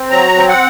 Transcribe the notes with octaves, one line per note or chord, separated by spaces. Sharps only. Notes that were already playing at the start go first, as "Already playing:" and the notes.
Already playing: C4
F#3 A#5
C4
F#5